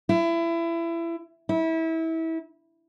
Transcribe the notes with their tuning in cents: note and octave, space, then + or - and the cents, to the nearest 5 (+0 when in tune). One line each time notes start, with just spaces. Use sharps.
E4 +25
E4 -25